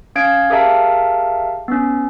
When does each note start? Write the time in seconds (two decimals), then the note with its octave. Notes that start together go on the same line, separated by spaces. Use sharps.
0.16 C#4 F5 G#6 D7
0.50 G4 G#4 A#4 E5 F5 A5
1.68 B3 C#4